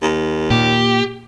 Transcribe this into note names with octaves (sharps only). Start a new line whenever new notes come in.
D#2
A#2 G4